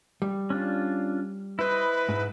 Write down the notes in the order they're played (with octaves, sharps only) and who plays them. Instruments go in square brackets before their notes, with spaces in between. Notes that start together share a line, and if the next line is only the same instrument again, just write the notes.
[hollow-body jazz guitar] G3
[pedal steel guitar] C#4 D4 F4
[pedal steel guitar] E4 C5 D#5 [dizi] B4
[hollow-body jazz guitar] G#2